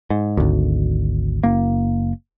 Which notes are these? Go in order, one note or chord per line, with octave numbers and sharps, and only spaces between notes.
G#2
G#1 D2
F#1 A#3